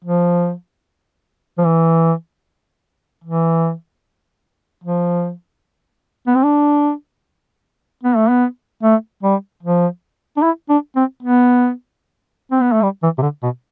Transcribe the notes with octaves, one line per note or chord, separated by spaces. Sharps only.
F3
F3
E3
E3
F3
B3
C4
D4
B3
A3
B3
A3
G3
F3
D4
E4
D4
C4
B3
C4
B3
A3
G3
E3
C3
D3
B2